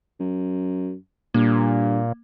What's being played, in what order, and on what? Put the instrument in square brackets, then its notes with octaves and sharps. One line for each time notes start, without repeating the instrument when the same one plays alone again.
[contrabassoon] F#2
[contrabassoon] G2 [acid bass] A#2 [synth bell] A#3